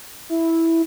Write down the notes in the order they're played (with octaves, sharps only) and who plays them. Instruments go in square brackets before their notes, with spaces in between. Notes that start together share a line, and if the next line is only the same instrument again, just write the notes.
[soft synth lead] E4